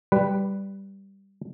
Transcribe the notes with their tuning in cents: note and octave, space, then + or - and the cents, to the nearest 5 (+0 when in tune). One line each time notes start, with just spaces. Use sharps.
G3 +0 B4 +0